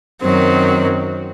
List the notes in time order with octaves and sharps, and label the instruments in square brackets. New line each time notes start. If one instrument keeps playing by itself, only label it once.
[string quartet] F#2 D#3 F#3 C4